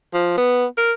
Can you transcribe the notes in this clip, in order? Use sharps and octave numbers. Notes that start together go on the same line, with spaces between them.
F3
B3
A#4